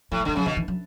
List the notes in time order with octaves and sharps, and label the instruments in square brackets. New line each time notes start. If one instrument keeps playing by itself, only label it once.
[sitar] A2 [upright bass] F#3
[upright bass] A3
[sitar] D3 [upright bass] G3
[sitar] C#3 [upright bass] F#3
[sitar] B2 [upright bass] D3
[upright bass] E3
F#3